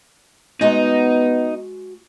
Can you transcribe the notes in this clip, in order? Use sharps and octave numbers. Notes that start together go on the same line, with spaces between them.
G#3 B3 D#4 F#4 A#5